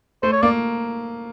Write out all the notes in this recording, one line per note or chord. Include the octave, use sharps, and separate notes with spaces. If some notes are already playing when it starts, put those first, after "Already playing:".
A3 C5
C#5
A#3 D5